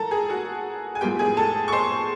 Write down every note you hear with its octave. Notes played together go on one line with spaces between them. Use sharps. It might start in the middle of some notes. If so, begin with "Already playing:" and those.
Already playing: G#2 E3 G#3 A4 A#4 A5 A#5
G#4 G#5
F#4 F#5
G#5
A2 F3 G#3 B3 G4 G5
G#4 G#5
A4 A5
C#6
C5 C6